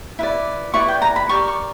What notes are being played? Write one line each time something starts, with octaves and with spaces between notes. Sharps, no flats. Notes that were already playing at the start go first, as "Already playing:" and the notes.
E4 B4 D5
E4 B4 D5 C#6
G5
A#5
B5
G4 A#4 D5 C#6
C#6